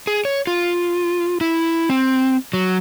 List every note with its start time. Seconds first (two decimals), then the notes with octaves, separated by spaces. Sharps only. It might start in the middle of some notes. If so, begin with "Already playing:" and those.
0.07 G#4
0.25 C#5
0.47 F4
1.41 E4
1.90 C4
2.53 F#3